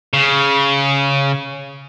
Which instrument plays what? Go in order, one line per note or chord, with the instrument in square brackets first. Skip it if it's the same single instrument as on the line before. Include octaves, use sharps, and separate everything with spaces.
[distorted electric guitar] C#3